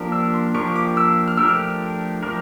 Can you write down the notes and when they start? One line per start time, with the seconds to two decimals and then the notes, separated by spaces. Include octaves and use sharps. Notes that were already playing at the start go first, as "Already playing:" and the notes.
Already playing: F3 A#3 D4 G4 A#4
0.12 E6
0.34 C6
0.55 F3 A#3 D4 G4 A#4 C#6
0.76 D6
0.97 E6
1.28 F6
1.37 F3 A3 D4 G4 A#4 E6
1.48 F6
2.23 F3 A3 D4 G4 A#4 F6